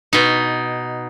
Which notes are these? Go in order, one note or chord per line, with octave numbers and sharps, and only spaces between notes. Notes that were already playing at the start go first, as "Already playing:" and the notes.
B2 D#4